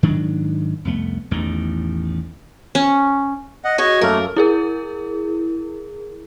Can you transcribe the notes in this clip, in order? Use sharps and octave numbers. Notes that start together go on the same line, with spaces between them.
G#2 D#3 F#3 D4
C2 F2 A3 B3
A1 E2 A2 D#3
C#4
D#5 F#5
F#4 G#4 C#5 D#5
F#2 A3 A#3 A4 A#4 F6
E4 G#4 A#4